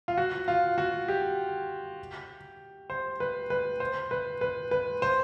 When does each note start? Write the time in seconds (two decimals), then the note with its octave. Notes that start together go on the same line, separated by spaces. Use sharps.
0.08 F4
0.18 F#4
0.48 F4
0.78 F#4
1.08 G4
2.90 C5
3.20 B4
3.50 B4
3.80 C5
4.11 B4
4.41 B4
4.71 B4
5.02 C5